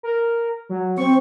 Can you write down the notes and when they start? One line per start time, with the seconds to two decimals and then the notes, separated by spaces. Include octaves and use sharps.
0.03 A#4
0.69 F#3
0.98 C4 C#6